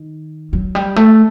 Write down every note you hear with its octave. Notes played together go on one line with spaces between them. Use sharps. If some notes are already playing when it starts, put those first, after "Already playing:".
Already playing: D#3
F#3
G3
A3